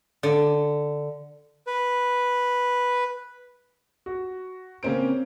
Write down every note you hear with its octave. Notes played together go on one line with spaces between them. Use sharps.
D3
B4
F#4
C#3 A#3 C4 C#4 C5 D7